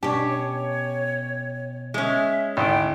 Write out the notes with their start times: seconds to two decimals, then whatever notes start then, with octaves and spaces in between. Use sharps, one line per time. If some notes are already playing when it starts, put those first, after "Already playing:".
0.03 B2 C#4 D4 G4 A5
0.29 C#5
1.94 G#3 C#4 E5
2.57 G#1 D2 E4 G5